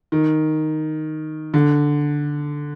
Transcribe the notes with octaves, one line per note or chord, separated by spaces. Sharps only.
D#3
D3